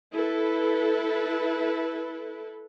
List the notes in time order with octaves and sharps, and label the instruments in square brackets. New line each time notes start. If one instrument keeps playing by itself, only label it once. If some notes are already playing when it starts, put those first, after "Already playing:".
[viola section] E4 A4 B4